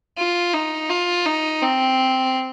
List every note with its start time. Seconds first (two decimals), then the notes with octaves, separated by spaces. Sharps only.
0.17 F4
0.53 D#4
0.89 F4
1.25 D#4
1.62 C4